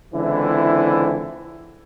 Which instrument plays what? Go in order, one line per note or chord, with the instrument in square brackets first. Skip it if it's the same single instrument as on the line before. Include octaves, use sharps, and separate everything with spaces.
[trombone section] C#2 D3 E3 C4 E4